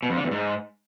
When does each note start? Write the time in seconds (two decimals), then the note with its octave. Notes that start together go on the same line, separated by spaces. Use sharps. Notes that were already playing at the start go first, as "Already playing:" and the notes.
0.03 B2
0.10 F2
0.17 D3
0.24 E2
0.31 G#2